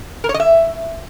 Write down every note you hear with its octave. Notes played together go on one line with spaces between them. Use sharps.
A#4
C#5
D#5
E5